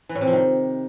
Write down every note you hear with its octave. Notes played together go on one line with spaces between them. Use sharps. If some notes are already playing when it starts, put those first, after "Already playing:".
E3
A2
C3
F3
D#3